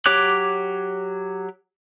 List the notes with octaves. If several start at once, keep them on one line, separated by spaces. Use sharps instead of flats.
F#3 G4 C#5 D6 F#6